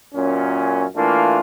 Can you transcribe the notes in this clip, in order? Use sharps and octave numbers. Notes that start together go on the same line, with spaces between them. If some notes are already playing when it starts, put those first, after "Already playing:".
F#2 A#2 C#4
E3 A3 A#3 D4 F4